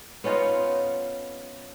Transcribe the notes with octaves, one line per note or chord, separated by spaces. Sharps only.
B3 C#4 D#4 F4